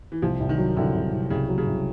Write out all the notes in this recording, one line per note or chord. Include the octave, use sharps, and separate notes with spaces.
E3
C2 F3
C2
D#3
F#3
C2 D3
C2
C2
C2 C#3
F#3
C#3
C2